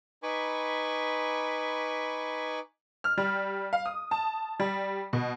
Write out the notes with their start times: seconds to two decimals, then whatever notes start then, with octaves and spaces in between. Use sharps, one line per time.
0.23 D#4 B4 G#5 B5 C#6 D6
3.04 F6
3.18 G3
3.73 F5
3.86 D#6
4.11 A5
4.60 G3
5.13 B2